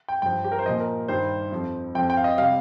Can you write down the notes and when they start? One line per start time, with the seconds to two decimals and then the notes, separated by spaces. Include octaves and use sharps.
0.08 G5
0.22 G2 F3 G5
0.44 G4
0.52 A#4
0.59 C5
0.66 A#2 F3 D#5
0.80 A#4
1.08 G2 D#3 G3 C5
1.52 F2 F3
1.95 F2 G5
1.98 F3
2.10 G5
2.17 F5
2.24 D#5
2.38 C3 G3 F5